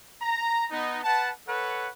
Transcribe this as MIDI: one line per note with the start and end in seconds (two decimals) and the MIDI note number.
0.22 0.65 82
0.71 0.99 59
0.71 0.99 63
1.04 1.30 71
1.04 1.30 78
1.04 1.30 81
1.48 1.90 69
1.48 1.90 71
1.48 1.90 73
1.48 1.90 78